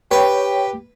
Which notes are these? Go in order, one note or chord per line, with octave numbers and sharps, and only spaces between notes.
G4 B4 C#5 G5